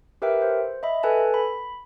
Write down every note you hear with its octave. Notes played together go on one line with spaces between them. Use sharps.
G4 A#4 B4 E5 G5
C5
D#5 E5 B5
A4 B4 G#5 A5
B5